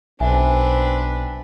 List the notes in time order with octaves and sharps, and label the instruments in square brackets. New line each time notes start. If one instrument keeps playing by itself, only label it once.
[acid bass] B1 [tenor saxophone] C4 [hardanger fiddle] D4 B4 [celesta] E5 G#5